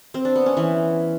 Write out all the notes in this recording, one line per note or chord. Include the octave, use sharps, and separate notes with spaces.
C4
D4
B3
C#4
E3